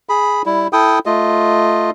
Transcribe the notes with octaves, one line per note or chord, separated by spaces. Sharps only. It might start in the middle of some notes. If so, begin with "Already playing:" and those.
G#4 B5
G3 E4
E4 A4 G5 D#6
A3 F4 D#5